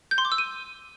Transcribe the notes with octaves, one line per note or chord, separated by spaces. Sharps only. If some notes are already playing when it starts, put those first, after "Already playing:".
G6
C6
D6
E6
D#7